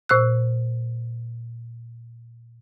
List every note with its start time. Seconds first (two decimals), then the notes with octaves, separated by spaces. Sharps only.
0.09 A#2 C5 E6 F#6